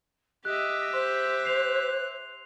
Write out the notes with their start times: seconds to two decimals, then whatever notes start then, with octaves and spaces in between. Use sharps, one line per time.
0.45 G4 D#5 E5 F#6
0.93 C5 C6 F#6
1.45 C7 F7